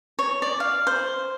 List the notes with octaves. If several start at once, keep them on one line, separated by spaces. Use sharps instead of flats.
C#5
D5
F5
C5